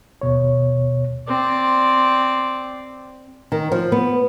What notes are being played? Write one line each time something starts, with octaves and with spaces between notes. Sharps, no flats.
D#2 B2 C#5
C4 D5
D#3
F3
B3